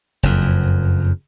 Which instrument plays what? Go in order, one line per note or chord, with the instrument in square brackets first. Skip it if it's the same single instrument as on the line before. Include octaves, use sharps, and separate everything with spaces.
[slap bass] F#1 F2